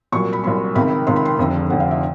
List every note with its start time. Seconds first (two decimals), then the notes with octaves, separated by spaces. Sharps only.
0.12 C2 A#2 F#3 C#6
0.33 B5
0.43 C2 A#2 F#3 C6
0.75 C#2 C3 D#3 B5
1.07 C#2 C3 D#3 C6
1.16 B5
1.25 C6
1.38 F1 F2 D3
1.70 F1 F2 D3 F#5
1.80 F5
1.91 E5